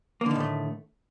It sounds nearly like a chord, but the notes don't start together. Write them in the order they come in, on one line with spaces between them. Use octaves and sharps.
A#3 D3 D#3 A2 A3